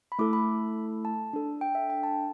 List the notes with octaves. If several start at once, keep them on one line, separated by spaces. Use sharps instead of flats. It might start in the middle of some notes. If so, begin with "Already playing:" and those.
B5
A3 E4 A4 D6
B5
A5
D4 A4
G5
E5
G5
A5